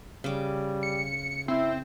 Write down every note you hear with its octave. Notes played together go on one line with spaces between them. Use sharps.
C#3 G3 D6
C#7
C4 E4